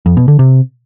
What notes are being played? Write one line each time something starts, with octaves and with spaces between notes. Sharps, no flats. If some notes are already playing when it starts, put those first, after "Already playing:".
F2
B2
D3
C3